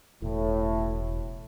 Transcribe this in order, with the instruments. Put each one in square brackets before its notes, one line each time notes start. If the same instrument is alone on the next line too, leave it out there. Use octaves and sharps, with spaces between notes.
[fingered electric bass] E1 [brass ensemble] A2